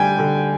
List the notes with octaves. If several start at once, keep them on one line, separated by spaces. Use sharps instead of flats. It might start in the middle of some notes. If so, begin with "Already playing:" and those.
Already playing: D3 G3 G5 G#5
D3